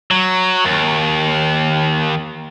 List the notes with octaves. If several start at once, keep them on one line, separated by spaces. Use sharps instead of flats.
F#3
D#2